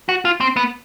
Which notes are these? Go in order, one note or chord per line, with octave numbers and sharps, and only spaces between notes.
F#4
F4
C4
B3